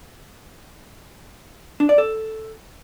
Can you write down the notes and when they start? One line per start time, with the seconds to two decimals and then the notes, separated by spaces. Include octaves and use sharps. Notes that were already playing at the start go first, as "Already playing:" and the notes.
1.80 D4
1.89 D5
1.98 A4